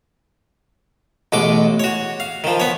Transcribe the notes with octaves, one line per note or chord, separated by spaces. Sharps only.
A1 B2 G#3 D6
F#4 C#5
F5
D#3 F3
B3 C#5